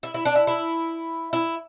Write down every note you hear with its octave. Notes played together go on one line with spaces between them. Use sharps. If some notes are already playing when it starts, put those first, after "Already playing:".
E4
E4
D4
E4
E4
E4